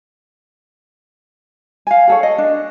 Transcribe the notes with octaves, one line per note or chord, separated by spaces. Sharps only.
F5 G#5
G#4 A4 C#5
D#5
D4